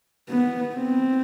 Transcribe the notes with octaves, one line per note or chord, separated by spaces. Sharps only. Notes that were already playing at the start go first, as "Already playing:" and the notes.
B3
C4